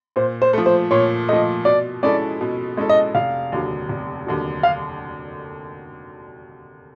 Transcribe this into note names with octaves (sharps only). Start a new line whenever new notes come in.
A#2 C5
C5
F3 A3
C5
A#2 C#5
F3 A3 D#5
B2 D5
G#3 C#4 E4 A4 D5
B2
G#3 C#4 E4 A4
D#5
F1 F5
D#2 D3 F#3
F1
D#2 D3 F#3
F5